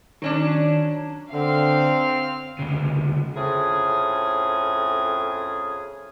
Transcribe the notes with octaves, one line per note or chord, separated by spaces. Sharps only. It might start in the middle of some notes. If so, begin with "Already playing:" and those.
D#3 F#3 C#4 D4
D3 C4 F5 F6
D2 C#3
F2 A2 C#4 G#4